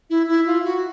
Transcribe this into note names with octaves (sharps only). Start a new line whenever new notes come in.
E4
E4
F4
F#4